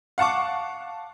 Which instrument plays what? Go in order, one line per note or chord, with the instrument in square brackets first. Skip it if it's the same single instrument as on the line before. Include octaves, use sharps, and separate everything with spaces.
[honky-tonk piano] F5 F#5 A5 C#6 D6